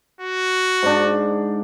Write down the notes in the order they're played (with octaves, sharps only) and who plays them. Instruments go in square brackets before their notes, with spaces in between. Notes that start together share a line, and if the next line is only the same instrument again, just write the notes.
[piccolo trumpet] F#4
[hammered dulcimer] G#2 D4